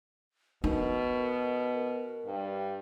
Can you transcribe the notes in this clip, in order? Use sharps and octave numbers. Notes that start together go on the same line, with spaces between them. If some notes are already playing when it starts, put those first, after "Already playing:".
B2 D#4 A#4
G2